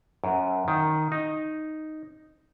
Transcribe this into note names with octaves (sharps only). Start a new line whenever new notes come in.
F#2
D#3
D#4